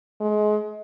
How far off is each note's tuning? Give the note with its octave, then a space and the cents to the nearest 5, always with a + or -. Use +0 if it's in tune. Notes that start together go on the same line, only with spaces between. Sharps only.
G#3 +25